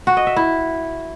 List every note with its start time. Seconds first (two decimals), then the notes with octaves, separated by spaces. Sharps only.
0.07 F#4
0.17 D#5
0.27 E5
0.36 E4